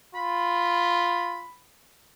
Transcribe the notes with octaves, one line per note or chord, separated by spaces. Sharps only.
F4 B5